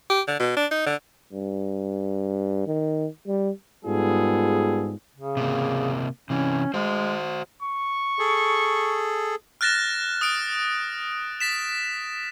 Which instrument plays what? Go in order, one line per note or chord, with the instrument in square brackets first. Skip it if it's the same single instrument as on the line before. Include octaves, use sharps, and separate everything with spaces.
[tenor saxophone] G4
D3
B2
D4
D#4
D3
[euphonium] G2
D#3
G3
[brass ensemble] G#2 G3 B3 F4 G#4 A4
[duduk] C#3
[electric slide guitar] C3 A#3
[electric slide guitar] C3 E3 [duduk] C#4
[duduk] G#3 [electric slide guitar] F#4 C5
[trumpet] C#6
[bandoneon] G#4 A4
[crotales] F6 F#6 A6 A#6 E7
D#6 F6 D7
A6 B6 E7